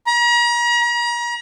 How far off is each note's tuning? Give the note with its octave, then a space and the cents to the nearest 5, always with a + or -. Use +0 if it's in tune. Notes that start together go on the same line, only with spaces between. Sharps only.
A#5 +40
A#5 +40